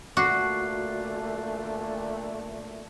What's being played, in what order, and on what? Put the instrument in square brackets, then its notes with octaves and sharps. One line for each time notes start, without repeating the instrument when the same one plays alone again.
[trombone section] A#2 D3 A3 [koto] F#4 [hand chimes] D6 F#6 C7